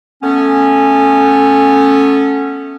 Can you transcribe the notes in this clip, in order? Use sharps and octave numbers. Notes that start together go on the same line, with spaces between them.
A3 B3 C#4